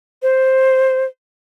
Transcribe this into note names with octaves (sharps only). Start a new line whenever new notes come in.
C5